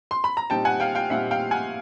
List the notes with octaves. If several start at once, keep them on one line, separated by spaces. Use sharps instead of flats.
C6
B5
A#5
A#2 G3 C4 D#4 G5 A5
F#5 G#5
F5 G5
F5 G5
A#2 G3 C4 D#4 E5 F#5
F5 G5
F#5 G#5